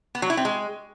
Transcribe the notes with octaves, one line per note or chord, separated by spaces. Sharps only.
B3
F#3
E4
C4
G#3